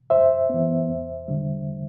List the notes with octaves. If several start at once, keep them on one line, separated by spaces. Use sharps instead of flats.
F#2 C5 E5
E3 B3
E2
D3 G3